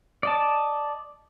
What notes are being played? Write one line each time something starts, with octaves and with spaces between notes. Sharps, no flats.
D5 D#5 A5